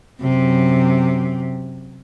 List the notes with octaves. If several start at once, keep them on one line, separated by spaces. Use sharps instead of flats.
F#2 C3